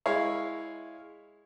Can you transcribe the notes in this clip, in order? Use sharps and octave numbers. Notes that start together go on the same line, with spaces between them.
G#3 E4 C#5 F5